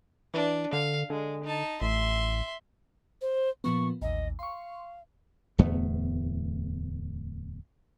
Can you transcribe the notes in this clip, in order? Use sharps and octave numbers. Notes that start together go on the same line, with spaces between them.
E3 D4
D3 F5
D3 G#3
D#4 A5
A1 E5 C6
C5
A#2 F3 B3 C#6
A1 D#2 D#5
F5 C6 C#6
D1 E2 A3 B3